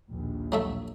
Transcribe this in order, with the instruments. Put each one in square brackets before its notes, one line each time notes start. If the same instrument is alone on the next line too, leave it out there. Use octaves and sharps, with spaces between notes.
[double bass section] A#1 D#2
[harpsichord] F#3 A3 E5